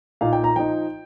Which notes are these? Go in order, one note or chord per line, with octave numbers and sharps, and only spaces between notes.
A#2 A#3 D#4 F5
G5
A#5
F3 D#4 G5